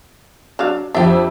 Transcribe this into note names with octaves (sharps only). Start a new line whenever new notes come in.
F#3 D4 F5
F2 D4 G4 E5